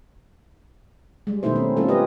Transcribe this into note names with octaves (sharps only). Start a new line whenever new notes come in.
G3 G#3
B2 D#3 A3 D#4 E4 C5
C4 C#4
G3 A3 C4 C#4 F4 A4
F4 G4 B4 D#5